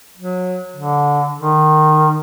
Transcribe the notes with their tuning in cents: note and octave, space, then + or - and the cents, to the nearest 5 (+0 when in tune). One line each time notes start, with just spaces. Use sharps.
F#3 -25
D3 -15
D#3 -20